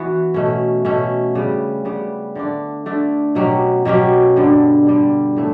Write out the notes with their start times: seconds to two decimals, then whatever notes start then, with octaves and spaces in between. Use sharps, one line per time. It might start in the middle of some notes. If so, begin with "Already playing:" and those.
Already playing: E3 B3 F#4
0.34 B2 A3 C#4
0.85 B2 A3 C#4
1.35 C#3 G3 B3
1.85 C#3 G3 B3
2.36 D3 A3 D4
2.86 D3 A3 D4
3.35 B2 F#3 C#4 G4
3.85 B2 F#3 C#4 G4
4.36 G2 D3 G3
4.86 G2 D3 G3
5.36 A2 E3 A3